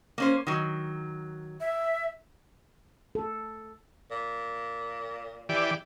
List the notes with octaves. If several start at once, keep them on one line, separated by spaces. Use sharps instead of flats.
A#3 C#4 C5
D#3 F#3
E5
A4
A#2
E3 G4 D5